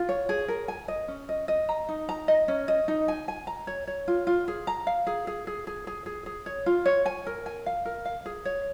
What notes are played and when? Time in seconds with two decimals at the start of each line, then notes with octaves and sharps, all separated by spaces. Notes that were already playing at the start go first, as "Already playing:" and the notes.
Already playing: F4
0.09 C#5
0.29 G#4
0.48 A#4
0.68 G#5
0.88 D#5
1.08 C#4
1.29 D#5
1.48 D#5
1.69 A#5
1.89 D#4
2.09 A#5
2.28 D#5
2.48 C#4
2.68 D#5
2.88 D#4
3.08 G#5
3.28 G#5
3.47 A#5
3.67 C#5
3.87 C#5
4.08 F4
4.27 F4
4.48 G#4
4.67 A#5
4.87 F5
5.07 G#4
5.27 G#4
5.47 G#4
5.67 G#4
5.87 G#4
6.06 G#4
6.26 G#4
6.46 C#5
6.66 F4
6.86 C#5
7.06 G#5
7.27 A#4
7.46 G#5
7.66 F5
7.85 A#4
8.05 F5
8.26 G#4
8.45 C#5